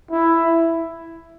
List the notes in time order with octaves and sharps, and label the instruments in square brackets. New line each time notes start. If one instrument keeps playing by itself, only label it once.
[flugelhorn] E4